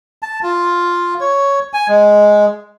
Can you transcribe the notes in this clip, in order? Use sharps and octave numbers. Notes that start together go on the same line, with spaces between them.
A5
F4
C#5
G#5
G#3